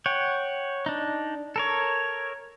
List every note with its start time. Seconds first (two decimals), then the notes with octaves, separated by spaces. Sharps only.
0.06 C#5 F#5 G5
0.86 D4 D#4
1.56 A4 A#4 C#5